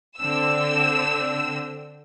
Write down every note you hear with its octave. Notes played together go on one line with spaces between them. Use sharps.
D3 C4 E6